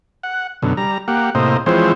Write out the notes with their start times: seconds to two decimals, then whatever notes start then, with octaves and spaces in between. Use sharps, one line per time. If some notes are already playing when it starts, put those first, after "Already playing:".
0.23 F#5
0.62 F#2 B2 D3
0.77 G3 A#5
1.08 A#3 G4 F#5
1.35 A2 C3 A#3 C5 D#5
1.66 E3 F3 G#3 C4 C5 C#5